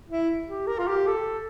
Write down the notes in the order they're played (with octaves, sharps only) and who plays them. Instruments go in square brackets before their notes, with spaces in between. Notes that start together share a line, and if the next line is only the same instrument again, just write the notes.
[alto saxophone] E4
G4
A#4
F4
G4
A4